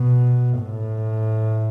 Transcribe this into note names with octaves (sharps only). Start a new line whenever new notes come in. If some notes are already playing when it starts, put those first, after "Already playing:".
Already playing: B2
A2